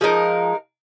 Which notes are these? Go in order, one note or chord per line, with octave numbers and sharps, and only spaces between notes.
F3 G#3 D#4 A#4